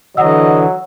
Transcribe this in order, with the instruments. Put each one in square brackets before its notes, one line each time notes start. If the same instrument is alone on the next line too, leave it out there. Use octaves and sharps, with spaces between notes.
[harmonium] D3 E3 [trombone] F#3 [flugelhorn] D#5 [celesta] F#5 E6